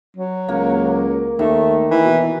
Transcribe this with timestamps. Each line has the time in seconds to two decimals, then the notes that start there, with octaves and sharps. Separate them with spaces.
0.17 F#3
0.49 C#2 A#3
1.39 D#2 D#3 A3
1.91 E3
2.05 B2